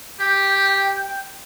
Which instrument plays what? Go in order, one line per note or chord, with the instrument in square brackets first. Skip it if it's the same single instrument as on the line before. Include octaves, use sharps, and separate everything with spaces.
[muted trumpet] G4 [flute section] G5 G6